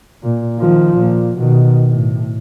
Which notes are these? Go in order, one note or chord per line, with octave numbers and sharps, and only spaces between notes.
A#2
D#3 F3
A#2
B2 D#3
A2